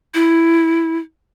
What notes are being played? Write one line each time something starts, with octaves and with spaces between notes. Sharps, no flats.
E4